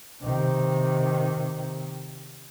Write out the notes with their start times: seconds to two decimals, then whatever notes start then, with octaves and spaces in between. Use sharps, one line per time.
0.22 C3 D#3